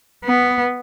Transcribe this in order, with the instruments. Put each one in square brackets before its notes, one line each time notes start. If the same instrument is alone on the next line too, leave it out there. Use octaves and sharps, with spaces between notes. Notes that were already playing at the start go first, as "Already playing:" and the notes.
[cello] B3